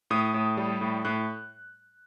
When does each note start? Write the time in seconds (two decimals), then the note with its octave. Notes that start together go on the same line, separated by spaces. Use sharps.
0.10 A2 D#6
0.34 A2
0.57 G3
0.81 A2
1.05 A2 F#6